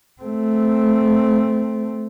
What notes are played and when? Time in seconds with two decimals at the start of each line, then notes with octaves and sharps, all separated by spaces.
0.22 A3 C4